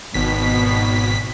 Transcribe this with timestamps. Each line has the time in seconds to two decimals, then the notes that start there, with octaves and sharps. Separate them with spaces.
0.14 G#1 B2 B6